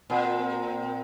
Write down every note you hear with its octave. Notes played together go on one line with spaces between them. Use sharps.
A#2 C4
A#4
C4
A#4
C4
C4